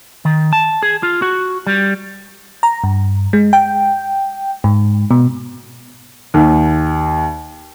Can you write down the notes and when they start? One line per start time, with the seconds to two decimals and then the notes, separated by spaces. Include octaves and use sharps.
0.25 D#3
0.53 A5
0.83 G#4
1.03 F4
1.22 F#4
1.67 G3
2.63 A#5
2.84 G2
3.33 G#3
3.53 G5
4.64 G#2
5.11 B2
6.34 D#2